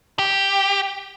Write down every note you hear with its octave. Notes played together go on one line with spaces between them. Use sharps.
G4